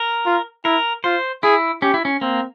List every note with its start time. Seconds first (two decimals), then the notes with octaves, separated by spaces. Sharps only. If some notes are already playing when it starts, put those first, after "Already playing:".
Already playing: A#4
0.26 F4
0.65 E4 A#4
1.04 F4 C5
1.43 E4 G#4
1.82 C#4 G4
1.94 E4
2.05 C#4
2.21 A#3 C4